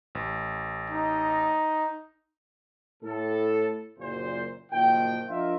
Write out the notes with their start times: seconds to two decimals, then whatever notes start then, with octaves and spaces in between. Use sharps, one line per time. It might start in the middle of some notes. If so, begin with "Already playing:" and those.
0.15 A1
0.90 D#4
3.03 A2 A4
3.99 F#1 F#2 A#2 C5
4.72 F#1 A#2 D#3 F3 G5
5.29 F3 D4 F4 A#4 D#5 E5